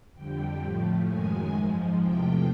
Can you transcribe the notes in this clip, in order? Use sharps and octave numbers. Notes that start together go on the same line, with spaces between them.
F2 D3 G3 G5
A2 F3 A3
F#2 D#3 G#3 G#5
G#2 F3 G#3
E2 C3 F3 A3 G5